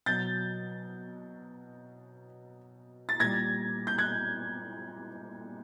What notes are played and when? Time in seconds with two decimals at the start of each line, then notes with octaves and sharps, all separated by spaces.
0.06 B2 F#3 G6 A6
3.09 A6
3.20 A#2 G3 G#6 A#6
3.87 G6
3.98 F#6 G#6